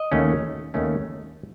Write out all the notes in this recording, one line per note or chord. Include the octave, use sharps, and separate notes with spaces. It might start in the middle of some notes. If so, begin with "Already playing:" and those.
Already playing: D#5
D#2 D#3 A3 C#4
D#2 D#3 A3 C#4